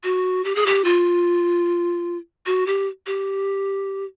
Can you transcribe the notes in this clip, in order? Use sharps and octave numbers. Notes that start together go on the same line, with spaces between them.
F#4
G4
G#4
G4
F4
F#4
G4
G4